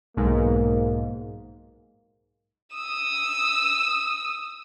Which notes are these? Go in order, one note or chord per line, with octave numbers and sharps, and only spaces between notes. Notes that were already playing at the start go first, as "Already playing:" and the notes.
B1 G#2 A#3
D#6 E6